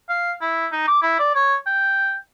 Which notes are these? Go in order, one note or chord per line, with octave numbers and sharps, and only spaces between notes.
F5
E4
D#4
D6
E4
D5
C#5
G5